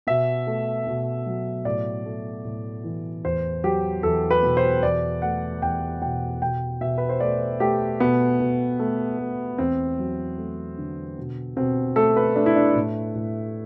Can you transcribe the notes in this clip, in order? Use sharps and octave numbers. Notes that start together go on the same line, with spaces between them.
B2 E5
A3
B2
F#3
A2 D5
A3
A2
E3
E2 C5
F#3 G4
E2 A4
B4
B2
C5
E2 D5
A3 F#5
E2 G5
B2 G5
B2 G5
B2 E5
B4
C5
A3 D5
A3 G4
B2 B3
B2
A3
A3
E2 C4
F#3
A3
D3
B2
B2 C4
A3 A4
B4
A3 D4
E4
D4
A2
A2